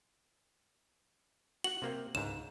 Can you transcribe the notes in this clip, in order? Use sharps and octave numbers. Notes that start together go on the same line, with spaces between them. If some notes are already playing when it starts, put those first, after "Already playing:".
F#4 F#5 F#7
C3 A#3 C4
C#2 G#2 E7